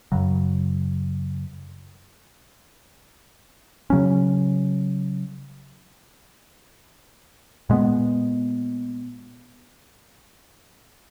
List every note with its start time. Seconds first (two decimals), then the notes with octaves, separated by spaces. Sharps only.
0.12 F#2 C#3 F#3
3.90 C#3 F#3 C#4
7.69 A#2 G#3 B3